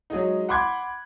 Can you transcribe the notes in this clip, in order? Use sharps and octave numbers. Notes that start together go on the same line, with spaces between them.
F#3 G#3 D#4
F#5 B5 C6 D6 F#6 G#6